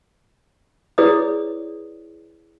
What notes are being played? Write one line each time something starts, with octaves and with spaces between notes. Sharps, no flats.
E4 G#4 B4 C#5 D5 D#6